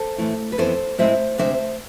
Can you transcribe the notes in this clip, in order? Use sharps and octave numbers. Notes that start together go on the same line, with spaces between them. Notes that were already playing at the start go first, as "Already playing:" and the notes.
Already playing: A4 C5
A2 E3 A3 E4
B4
F2 E3 B3 E4 A4 C5
A2 G#3 C4 E4 C5 E5
D2 C3 G#3 D4 C5 E5